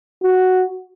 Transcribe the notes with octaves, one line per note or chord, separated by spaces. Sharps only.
F#4